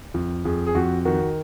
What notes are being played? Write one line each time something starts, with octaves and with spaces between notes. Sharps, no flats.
F2
F2 G#4
G#4
F2 F#4
D#3 F#4